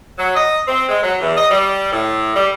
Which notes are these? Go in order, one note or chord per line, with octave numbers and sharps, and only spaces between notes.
F#3
D#5
C4
G#3
F#3
E2
D#5
G3
A2
G3